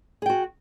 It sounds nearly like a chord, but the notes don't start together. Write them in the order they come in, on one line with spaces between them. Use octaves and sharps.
G#4 G5 F#4